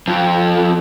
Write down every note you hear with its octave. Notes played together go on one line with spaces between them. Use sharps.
F2